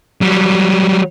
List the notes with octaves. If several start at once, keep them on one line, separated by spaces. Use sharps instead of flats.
F#3 G3